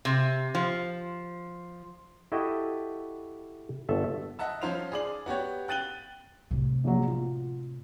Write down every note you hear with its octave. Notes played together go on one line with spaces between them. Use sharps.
C3
F3
E4 F#4 G4 A4 D#5 G5
G1 A4 E5
D#5 E5 F#5 A5 E6
F3 C#4 F4 C5 F5 F7
G#4 D5 F#7
B3 F#4 G4 C#5
G5 F#6 A6 D#7 F#7 G7
A2 C3
A#1 A#2 F#3
F4